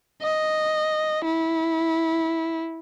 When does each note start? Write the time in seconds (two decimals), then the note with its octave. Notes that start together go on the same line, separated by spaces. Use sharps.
0.22 D#5
1.25 E4